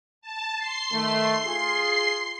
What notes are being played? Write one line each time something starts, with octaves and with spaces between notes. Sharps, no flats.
A5
C6 C7
D#3 A3
F4 G#4